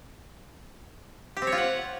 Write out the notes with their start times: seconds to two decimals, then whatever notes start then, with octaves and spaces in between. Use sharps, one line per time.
1.37 G4
1.42 C4
1.47 C#5
1.52 F4
1.58 F#5